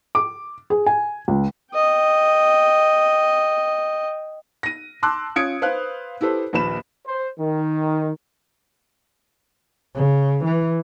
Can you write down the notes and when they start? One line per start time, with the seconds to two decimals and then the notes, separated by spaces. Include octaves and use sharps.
0.15 D6
0.70 G#4
0.86 G#5
1.28 C#2
1.74 D#5 G5
4.63 A#6 D#7
5.03 A5 C6 D6 E6 F#6
5.36 C#4 F4 D#6 G#6 C#7 D7
5.62 B4 C5 F5 F#6
6.21 E4 G4 A4 B4 C5
6.53 A#1 D#2 F3 B4 B5 E7
7.06 C5
7.39 D#3
9.95 C#3
10.45 E3